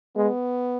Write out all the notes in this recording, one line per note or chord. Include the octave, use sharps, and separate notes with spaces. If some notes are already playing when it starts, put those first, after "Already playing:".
G#3 B3